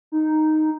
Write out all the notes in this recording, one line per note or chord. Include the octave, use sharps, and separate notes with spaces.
D#4